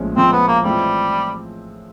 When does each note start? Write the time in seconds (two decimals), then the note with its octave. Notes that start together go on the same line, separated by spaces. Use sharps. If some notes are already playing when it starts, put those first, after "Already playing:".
Already playing: A#1 A2 F3 G#3 C#4
0.16 A#1 A2 F3 G#3 C4 C#4
0.32 B3
0.48 A#3
0.64 A2 E3 G3 G#3 C4 F4